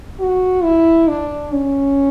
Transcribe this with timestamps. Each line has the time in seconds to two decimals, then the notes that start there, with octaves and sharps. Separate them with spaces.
0.20 F#4
0.64 E4
1.08 D4
1.52 C#4